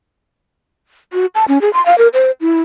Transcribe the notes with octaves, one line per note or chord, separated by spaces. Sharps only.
F#4
A5
C#4
G#4
C6
F5
A#4
C5
E4